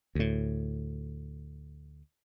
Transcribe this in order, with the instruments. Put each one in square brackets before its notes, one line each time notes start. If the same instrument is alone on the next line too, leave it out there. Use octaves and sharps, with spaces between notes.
[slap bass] D2 A2